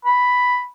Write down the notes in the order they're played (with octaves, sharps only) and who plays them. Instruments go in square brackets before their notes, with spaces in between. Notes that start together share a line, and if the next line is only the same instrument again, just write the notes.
[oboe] B5